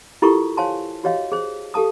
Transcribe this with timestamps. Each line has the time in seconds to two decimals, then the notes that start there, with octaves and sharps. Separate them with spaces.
0.22 E4 F4 G4 A4 A#4 C#6
0.57 C5 C#5 F5 G#5 A5 C6
1.04 F#4 G4 C#5 D#5 F5
1.32 G#4 C5
1.74 G4 A4 F5 A5 D#6